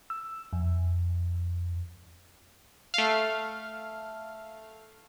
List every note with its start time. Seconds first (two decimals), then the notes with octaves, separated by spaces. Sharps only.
0.10 E6
0.53 F2
2.94 A3 F5